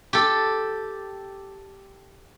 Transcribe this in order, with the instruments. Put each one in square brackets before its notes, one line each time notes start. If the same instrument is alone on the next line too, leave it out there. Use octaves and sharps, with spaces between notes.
[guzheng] G4 A4